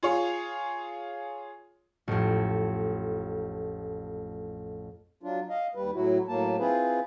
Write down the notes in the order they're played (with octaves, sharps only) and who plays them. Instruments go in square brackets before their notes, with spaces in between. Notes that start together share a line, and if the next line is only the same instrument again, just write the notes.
[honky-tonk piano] F4 G#4 C#5
[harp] A1 F2
[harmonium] F#3 D4 F4
D#5 F5
D#2 G3 B4
A2 F#3 E4 F#4
A2 F#3 A#3 A5
C4 E4 F4 G#4 B4 C5